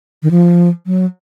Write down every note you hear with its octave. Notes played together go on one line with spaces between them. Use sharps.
D#3
F3
F#3